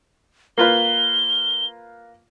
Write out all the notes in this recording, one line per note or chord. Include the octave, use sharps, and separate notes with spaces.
A#3 F4 B4 G7